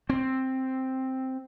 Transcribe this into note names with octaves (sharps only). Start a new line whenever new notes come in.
C4